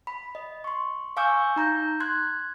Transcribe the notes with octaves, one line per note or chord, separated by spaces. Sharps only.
B5
D#5
C6 C#6
F5 G#5 C#6 D6 E6 G6
D#4 A#5 G6
C6 F#6 G#6